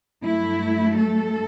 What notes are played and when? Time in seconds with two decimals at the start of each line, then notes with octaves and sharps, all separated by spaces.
0.23 G2 F#3 A3 E4
0.99 A4